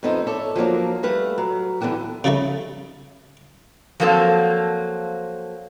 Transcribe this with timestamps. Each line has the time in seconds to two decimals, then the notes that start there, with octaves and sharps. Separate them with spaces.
0.03 F2 A3 B3 D#4 A4 C5
0.27 A4 C#5 D5 E5
0.56 F3 F#3 A#3 D4
1.03 G3 A3 B4 F5 F#5
1.38 F#3
1.81 D3 E3 B3 F#4 G4
2.24 C#3 F3 G3 A3 D#4
4.00 F3 F#3 A#3 C4 A4